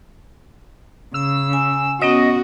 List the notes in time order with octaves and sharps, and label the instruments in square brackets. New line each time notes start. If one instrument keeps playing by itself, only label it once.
[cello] C#3 [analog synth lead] E6
[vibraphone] G#5
[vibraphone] B3 C#4 C#5 [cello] F#4 [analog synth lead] D#5